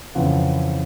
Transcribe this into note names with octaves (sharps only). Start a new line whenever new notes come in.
F2 C#3 E3 F#5